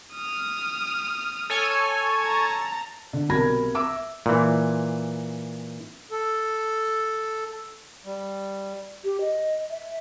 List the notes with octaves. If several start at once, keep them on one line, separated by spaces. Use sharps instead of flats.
D#6 F6
A4 C#5 G#5
A5 A#5
D3
B1 C3 A#4 B5 G#6 A#6
E5 D6 E6
A#2 E3
A4
G3
G4
D#5
E5